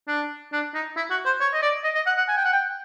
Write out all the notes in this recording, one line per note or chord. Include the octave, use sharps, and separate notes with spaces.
D4
D4
D#4
E4
F#4
C5
C#5
D#5
D5
D#5
D#5
F#5
F#5
G#5
G5
F#5
G5